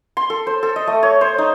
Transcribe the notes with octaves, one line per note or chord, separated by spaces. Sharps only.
C6
A4
C5
A4
D#5
A3
C#5
C5
D#4